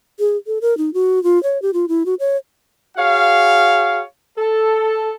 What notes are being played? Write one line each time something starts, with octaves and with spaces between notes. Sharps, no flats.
G#4
A4
A#4
D#4
F#4
F4
C#5
G4
F4
E4
F#4
C#5
F#4 G#4 C#5 F5
A4